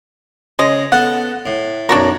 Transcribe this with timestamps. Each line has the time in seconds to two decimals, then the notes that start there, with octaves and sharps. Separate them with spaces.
0.59 C#3 G#3 D#5
0.92 B3 A4 F#5
1.46 A2
1.89 B1 F#2 D4 F#4 A#4